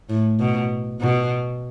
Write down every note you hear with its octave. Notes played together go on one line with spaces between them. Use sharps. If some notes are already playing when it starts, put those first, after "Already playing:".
A2
B2
B2